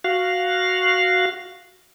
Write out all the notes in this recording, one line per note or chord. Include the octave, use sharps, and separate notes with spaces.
F#4 F5